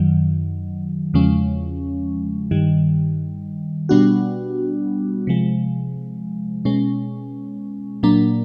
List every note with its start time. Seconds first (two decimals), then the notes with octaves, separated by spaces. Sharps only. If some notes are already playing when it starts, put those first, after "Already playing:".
Already playing: F#2 D#3 F#3
1.14 E2 C#3 F3 G#3 C#4
2.51 G2 D#3 G3
3.89 B2 G3 B3 D4 F#4
5.27 C3 F3 G#3
6.65 B2 G#3 C#4
8.03 A#2 F#3 A#3 D4